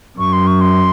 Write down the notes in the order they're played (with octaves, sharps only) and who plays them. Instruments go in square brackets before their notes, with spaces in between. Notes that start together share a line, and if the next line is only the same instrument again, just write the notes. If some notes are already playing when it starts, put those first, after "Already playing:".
[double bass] F#2 [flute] C#6
[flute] C6
C#6
C6